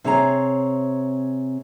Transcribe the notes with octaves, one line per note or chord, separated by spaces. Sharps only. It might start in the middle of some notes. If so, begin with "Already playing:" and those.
C3 C4 G#4 C#5 G#5 A#5